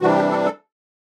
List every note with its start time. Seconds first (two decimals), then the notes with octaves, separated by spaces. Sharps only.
0.01 C3 E3 G3 D4 F#4
0.15 G4
0.30 A4
0.45 A4